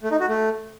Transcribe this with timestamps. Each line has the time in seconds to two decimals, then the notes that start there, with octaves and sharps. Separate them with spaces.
0.03 A3
0.11 D#4
0.20 F#4
0.28 A3